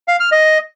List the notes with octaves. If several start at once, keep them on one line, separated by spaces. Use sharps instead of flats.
F5
F6
D#5